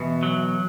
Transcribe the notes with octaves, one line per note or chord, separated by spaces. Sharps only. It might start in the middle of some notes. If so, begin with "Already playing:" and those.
Already playing: B2 E3
F#3